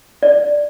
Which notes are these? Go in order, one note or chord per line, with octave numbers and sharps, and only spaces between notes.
D5